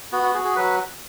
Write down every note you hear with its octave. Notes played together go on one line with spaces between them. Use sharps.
B3 F#4
F#4
F#4 G#4
G#4
F#3 B4